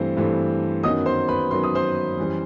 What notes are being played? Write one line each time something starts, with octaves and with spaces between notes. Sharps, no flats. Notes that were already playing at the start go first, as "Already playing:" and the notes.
Already playing: G2 E3 A3 C4 C5
G2 E3 A3 C4
F#2 D#3 F#3 B3 D#5 D#6
C5 C6
B4 B5
F#2 D#3 F#3 B3 C6
D#6
C5 C6
F#2 E3 G3